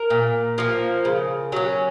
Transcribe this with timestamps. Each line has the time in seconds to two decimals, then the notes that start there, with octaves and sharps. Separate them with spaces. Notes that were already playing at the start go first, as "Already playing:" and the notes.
Already playing: A#4
0.10 A#2
0.58 F3 A#3
1.05 C#3
1.52 F#3 C#4